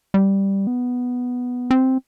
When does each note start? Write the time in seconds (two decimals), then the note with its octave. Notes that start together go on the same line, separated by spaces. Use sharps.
0.14 G3
0.67 B3
1.71 C4